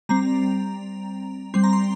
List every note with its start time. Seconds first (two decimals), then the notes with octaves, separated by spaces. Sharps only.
0.09 G3 C4 A#5
1.54 G3 C4 C6
1.64 A#5
1.73 C6